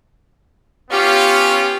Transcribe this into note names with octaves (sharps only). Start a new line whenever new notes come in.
B3 C#4 F4 G4